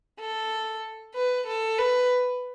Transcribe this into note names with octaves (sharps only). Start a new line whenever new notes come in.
A4
B4
A4
B4